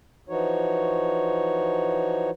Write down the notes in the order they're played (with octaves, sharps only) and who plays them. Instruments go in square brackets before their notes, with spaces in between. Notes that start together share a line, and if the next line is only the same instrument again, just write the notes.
[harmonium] E3 F3 D#4 F#4 C#5